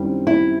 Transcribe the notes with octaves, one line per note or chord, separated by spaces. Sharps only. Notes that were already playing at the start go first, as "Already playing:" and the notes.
Already playing: F#2 D#3 G3 C4 E4
E4